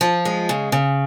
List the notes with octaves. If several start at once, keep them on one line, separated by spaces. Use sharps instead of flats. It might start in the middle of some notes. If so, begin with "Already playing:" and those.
F3
G#3
C#3
C#3